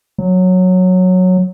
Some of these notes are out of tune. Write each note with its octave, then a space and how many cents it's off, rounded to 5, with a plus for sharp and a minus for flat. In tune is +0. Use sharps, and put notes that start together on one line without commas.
F#3 -10